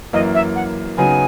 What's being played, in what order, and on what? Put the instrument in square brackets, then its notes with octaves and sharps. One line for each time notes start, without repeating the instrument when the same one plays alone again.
[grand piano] F#2 E3 A#3 [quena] D#5
[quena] E5
F#5
[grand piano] C#3 F#3 B3 D#4 [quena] G#5